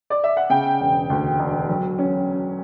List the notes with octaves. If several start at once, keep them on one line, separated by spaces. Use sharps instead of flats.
D5
E5
F#5
C#3 G5
E1
D2
E1
F#3
C#4